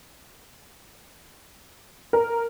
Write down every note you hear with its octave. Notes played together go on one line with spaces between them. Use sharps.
A#4